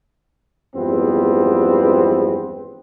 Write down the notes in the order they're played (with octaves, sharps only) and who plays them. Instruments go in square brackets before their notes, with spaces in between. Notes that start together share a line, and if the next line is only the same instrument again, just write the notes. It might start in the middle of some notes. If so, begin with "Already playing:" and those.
[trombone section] E2 G2 F3 G#3 B3 C4